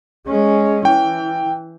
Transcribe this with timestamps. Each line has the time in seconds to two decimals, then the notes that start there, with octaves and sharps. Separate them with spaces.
0.27 G#3 C#4
0.85 E3 G5